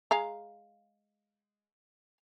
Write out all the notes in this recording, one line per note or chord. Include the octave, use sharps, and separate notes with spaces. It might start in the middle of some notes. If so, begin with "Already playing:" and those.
G#3 F5 A#5